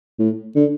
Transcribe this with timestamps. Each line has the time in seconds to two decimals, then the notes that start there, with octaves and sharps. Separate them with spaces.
0.19 A2
0.55 D3